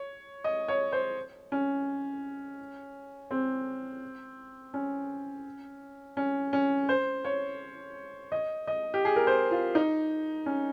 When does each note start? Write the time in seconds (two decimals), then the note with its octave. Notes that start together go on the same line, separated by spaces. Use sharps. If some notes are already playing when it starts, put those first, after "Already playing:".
Already playing: C#5
0.44 D#5
0.68 C#5
0.92 C5
1.52 C#4
3.31 C4
4.74 C#4
6.17 C#4
6.53 C#4
6.89 C5
7.24 C#5
8.32 D#5
8.67 D#5
8.94 G4
9.05 G#4
9.16 A#4
9.27 C5
9.51 F4
9.75 D#4
10.46 C#4